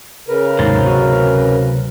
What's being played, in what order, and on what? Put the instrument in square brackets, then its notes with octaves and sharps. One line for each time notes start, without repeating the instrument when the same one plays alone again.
[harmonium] C#3 A#4 B4
[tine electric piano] D#2 G#2 A6 [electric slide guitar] C3 F#3 C5
[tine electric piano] D2 F#4